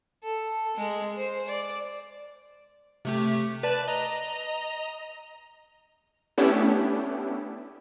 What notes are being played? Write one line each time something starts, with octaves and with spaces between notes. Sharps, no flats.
A4
G#3
C5
D5
C3 A3 G4
B4 D5 A5
D#5 A#5
A3 B3 C#4 D4 E4 G4